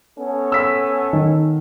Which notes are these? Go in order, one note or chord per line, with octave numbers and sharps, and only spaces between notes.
B3 C#4 A4
E6 B6
D#3